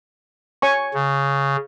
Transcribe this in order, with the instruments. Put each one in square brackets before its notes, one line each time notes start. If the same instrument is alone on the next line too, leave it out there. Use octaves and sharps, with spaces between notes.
[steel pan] C#5 G#5 C#6
[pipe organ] C#3